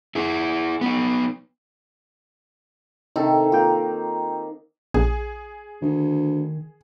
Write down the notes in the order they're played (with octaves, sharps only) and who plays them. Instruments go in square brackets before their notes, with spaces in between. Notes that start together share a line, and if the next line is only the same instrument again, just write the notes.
[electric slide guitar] E4 G#4
B3 D#4
[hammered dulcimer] C3 D#3 A4 [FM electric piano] D#4
[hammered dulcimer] A#3 [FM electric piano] F4 G5
[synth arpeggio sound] A#1 [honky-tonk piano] G#4
[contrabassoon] D2 [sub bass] D#3